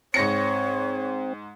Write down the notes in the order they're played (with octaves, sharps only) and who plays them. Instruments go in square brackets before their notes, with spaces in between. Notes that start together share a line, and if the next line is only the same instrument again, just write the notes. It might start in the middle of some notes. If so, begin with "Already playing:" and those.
[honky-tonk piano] G#2 A#6 C#7 [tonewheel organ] C4 [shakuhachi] C#5